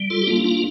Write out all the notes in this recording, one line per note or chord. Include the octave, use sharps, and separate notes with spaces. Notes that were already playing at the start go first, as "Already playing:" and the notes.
Already playing: G3
F4 A4
G4
A#3 D4 F4
D4 F4